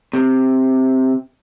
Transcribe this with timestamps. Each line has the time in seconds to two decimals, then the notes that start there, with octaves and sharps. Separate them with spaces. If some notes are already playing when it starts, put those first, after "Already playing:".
0.13 C3